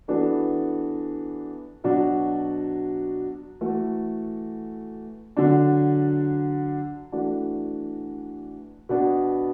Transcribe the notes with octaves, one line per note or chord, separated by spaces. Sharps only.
E3 B3 D4 F#4 A4
B2 F#3 D4 F#4
E3 A3 F#4 A4
D3 F#3 D4
E3 A3 D4 F#4
B2 B3 D4